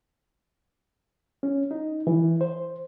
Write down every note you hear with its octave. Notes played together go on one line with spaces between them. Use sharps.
C#4
D#4
E3
C5